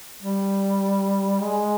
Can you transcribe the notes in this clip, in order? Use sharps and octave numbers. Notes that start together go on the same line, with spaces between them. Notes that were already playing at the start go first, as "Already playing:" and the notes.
G3
G#3